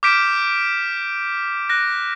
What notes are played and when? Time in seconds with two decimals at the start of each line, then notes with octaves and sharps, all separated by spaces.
0.03 D6 F6 G6 B6 D7 E7
1.69 F#6 A#6